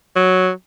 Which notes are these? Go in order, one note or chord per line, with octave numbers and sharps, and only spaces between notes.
F#3